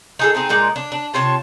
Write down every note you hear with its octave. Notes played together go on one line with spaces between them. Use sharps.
D#4 G#4 A4
C4 D#4 G#4
A#2 G#3 D#4 D5
D4
D4
C3 F4 C#5 A5